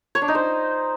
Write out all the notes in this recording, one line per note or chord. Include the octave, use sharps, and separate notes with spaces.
C#5
D4
D#4
C5